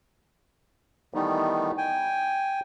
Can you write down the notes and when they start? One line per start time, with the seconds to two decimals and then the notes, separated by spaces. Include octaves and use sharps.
1.14 D#3 E3 G3 A3 B3 D#4
1.78 G5 G#5